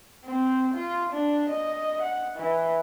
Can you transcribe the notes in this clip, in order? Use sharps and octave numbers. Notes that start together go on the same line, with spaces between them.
C4
F4
D4
D#5
F#5
E3